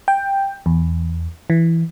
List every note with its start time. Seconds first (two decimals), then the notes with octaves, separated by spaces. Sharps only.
0.08 G5
0.66 E2
1.50 E3